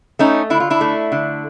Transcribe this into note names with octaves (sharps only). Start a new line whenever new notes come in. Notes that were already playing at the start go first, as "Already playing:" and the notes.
A3 C#4 D#4
D3 E4
F4
D4 E4
A3
D3